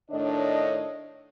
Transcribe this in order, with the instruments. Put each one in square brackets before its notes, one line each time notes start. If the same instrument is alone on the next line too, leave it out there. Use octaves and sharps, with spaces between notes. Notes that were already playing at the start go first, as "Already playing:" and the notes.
[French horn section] A2 D#3 D4 [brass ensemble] C#5 D#5